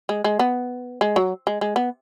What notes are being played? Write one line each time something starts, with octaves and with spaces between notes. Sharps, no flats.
G#3
G#3
B3
G#3
F#3
G#3
G#3
B3